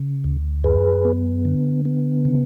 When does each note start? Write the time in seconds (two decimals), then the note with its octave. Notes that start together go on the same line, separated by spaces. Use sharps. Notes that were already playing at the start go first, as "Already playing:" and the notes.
Already playing: C#3
0.24 D2
0.64 F#2 G#4 B4
1.05 B3
1.45 D3
1.85 B3
2.25 C#3